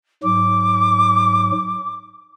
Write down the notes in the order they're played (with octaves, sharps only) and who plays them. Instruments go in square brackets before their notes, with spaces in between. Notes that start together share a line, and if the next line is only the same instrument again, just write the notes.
[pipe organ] G#2 F#3 [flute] D6